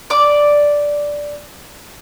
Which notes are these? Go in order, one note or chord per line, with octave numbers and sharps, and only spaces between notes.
D5 D6